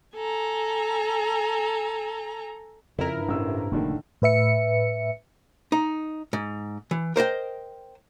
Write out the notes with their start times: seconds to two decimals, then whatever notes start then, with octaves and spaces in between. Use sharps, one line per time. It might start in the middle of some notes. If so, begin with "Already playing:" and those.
0.15 A4 G#5 A#5
2.99 F2 C#3 F3 E4 A#4
3.13 G2
3.28 A1 A2 C3 E6
3.72 F1 A2 D3 D#3 A#3
4.22 A2 B4 E5 C#7
5.72 D#4
6.33 G#2
6.91 E3
7.16 A#4 C5 D#5 G5